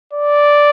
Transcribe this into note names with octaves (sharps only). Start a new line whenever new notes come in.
D5